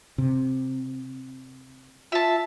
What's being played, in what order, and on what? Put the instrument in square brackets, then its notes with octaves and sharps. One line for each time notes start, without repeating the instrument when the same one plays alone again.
[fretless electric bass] C3
[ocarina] F4 [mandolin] E5 A5